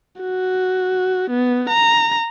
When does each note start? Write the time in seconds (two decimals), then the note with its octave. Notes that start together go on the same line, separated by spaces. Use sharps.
0.21 F#4
1.31 B3
1.69 A#5